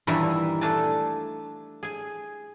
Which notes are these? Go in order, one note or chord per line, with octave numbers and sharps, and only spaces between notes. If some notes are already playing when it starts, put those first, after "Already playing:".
G2 A#2 D#3 E3 E5
A3 D4 G#5 A5
G#4 G#5